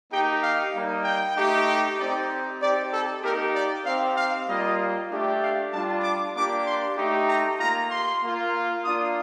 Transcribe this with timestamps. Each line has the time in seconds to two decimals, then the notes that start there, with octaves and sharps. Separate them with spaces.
0.11 A#3 D#4 G4 G5
0.43 F5
0.74 G3 A#3 D#4
1.04 G5
1.36 A3 D#4 G4
1.98 C4 D#4 G4 D5
2.61 C4 D#4 G4 D5
2.92 A4
3.23 A#3 D#4 G4 A#4
3.54 D5
3.85 C4 D#4 G4 F5
4.17 F5
4.47 G3 A#3 F4 D#5
5.10 A3 D4 G4
5.41 F5
5.73 G3 D4 F4 A5
6.03 D6
6.35 A#3 D4 G4 D6
6.66 C6
6.97 A3 D#4 G4
7.28 A#5
7.59 A#3 F4 A#5
7.91 C6
8.22 A#3 F4
8.84 A#3 D4 F4 D#6